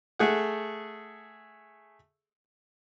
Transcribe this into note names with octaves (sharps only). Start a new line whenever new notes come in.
A3 G#4 F#5